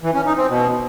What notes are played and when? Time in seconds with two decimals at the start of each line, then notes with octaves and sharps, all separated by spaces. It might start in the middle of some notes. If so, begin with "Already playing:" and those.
0.03 E3
0.14 C#4
0.26 D#4
0.37 C4
0.49 B2